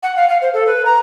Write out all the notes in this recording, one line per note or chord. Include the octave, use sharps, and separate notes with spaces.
F#5
F5
F5
C5
A4
B4
A#5